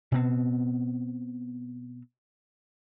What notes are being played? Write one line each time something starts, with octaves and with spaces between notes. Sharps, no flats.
B2 B3 C4